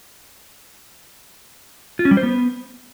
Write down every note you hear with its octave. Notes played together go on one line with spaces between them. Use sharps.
F4
C#4
G3
C5
B3